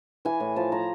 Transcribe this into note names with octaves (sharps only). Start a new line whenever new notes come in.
E3 G#5
A2
F3 A5
F3 A#5